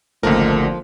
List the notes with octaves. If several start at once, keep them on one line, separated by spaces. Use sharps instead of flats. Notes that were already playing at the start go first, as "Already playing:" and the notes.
G#1 C#2 D3 F3 A3 A#3 A#4